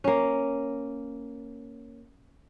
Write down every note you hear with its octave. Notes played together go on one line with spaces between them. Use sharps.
A#3 C#4